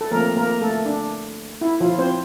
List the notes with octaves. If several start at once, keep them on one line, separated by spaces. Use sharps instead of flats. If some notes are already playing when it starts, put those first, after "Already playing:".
A4
F3 A3 A#3 C4 A#4
A#3 A#4
A3 A4
D4
E4
F3 F4
C4 C5